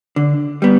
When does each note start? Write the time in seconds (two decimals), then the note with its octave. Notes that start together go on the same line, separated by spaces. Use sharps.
0.16 D3
0.62 G3 B3